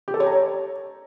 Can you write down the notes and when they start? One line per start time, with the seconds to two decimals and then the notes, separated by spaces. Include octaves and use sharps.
0.08 G4
0.14 A4
0.20 C#5
0.26 A#5
0.33 C#5